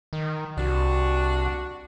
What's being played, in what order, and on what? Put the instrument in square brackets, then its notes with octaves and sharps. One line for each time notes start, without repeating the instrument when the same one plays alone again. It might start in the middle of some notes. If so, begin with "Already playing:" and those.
[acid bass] D#3
[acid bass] C2 [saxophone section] D4 F#4